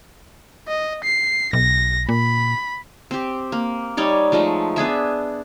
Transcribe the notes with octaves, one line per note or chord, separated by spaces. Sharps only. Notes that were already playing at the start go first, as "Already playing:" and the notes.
D#5
C7
B1 A#6
A#2 B5
C4 G4
A#3
G3 D#4 C#5 D5
F3 G#3 A3 D#4
B3 D4 G#4 E5